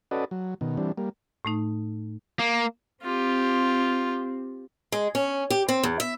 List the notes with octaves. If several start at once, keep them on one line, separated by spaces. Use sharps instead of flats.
C#4 F#4 A4 B4 D5 D#5
F#3
B2 D#3
E3 G3 C4 D4
G3 A#3
A2 A3 D#4
A#3
C4 F4 G4
G#3
C#4
G4
C4
E2
E5